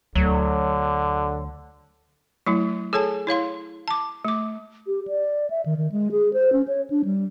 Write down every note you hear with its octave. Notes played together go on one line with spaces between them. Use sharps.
D2 D3 F#3
F#3 A3 E4
G#4 A4 C#5 G#5 A5
E4 C#5 F5 C6
A5 D6
A3 D6
G4
D5
E5
D#3
D#3
G#3
G#4
C5
C#4
C#5
D4
G3